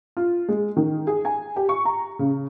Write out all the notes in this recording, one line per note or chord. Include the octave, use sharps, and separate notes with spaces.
F4
G#3
D#3
G#4
G#5
G4
C#6
A#5
C#3